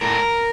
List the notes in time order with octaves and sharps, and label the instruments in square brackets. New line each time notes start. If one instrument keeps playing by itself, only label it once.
[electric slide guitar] A2 A#4